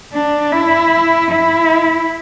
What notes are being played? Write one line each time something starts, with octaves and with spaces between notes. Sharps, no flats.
D4
E4
E4